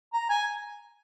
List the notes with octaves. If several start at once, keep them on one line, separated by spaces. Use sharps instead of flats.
A#5
G#5